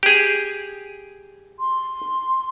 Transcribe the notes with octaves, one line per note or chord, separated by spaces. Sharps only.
G4 G#4
C6